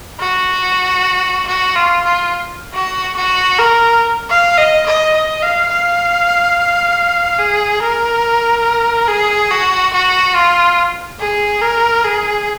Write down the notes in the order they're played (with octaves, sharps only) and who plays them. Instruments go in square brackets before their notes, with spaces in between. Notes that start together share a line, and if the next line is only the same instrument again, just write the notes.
[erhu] F#4
F#4
F4
F4
F#4
F#4
A#4
F5
D#5
D#5
D#5
F5
F5
G#4
A#4
G#4
F#4
F#4
F4
G#4
A#4
G#4